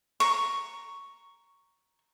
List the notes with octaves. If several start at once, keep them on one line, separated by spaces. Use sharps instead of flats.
A#5 C#6